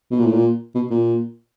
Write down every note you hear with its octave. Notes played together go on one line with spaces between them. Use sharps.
B2
A#2
A2
A#2
B2
A#2